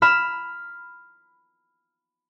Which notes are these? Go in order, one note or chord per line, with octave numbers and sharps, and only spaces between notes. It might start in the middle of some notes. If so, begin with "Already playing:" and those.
B5 F6 E7